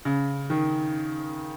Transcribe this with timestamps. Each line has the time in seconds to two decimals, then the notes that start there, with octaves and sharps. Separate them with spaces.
0.05 C#3
0.50 D#3